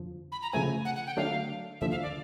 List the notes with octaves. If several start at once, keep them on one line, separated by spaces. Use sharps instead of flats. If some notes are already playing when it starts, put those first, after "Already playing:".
Already playing: F2 D3 F3
B5
A#5
C#3 F3 A3 C4 G#5
F#5
F#5
G5
D3 F#3 A3 D4 F5
D#2 D3 F3 E5
F5
D5